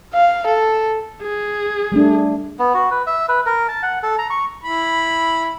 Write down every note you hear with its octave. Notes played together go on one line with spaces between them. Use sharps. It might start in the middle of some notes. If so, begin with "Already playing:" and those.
F5
A4
G#4
G3 A3 D4
B3
F#4
B4
E5
B4
A#4
A5
F#5
A4
A#5
C#6
E4 B5